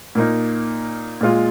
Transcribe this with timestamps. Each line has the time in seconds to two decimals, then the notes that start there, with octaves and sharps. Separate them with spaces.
0.15 A#2 A#3 D#4
1.21 A#2 G#3 F4